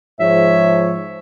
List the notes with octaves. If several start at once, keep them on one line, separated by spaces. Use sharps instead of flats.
G#2 F3 C#5 E5